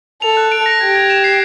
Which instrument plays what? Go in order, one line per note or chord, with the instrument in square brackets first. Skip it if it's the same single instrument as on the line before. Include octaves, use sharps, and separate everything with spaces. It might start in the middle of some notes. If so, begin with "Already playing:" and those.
[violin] A4 [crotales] F7
[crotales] F#6
D7
A#6
[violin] G4 [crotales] G#6
[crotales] G#6
E7
C7